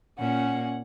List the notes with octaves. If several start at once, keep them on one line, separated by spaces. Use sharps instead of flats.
A#2 C#4 F#5